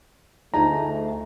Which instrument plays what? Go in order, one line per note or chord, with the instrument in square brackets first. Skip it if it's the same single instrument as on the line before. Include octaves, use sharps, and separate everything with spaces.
[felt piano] D2 F4 A5 [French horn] A3 [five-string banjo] D#4 G#4 [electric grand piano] A#5